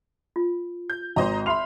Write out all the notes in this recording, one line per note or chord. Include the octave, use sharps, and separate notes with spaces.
F4
G6
G#1 C5 D#5 A#5
E5 B5 C6 F6 F7